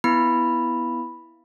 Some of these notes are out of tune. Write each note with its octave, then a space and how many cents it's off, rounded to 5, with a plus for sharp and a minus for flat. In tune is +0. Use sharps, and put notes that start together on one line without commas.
B3 +0 E4 +0 B5 +0